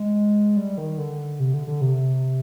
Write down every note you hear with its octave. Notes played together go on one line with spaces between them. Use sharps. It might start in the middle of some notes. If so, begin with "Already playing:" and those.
Already playing: G#3
G3
D#3
D3
C3
D3
D3
C3